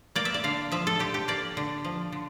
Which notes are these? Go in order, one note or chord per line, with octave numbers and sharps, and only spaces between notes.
A#3 D5
E5
D5
D3 F5
F3 E5
A4
D3 G4
G4
A#3 D5
D3
F3
D3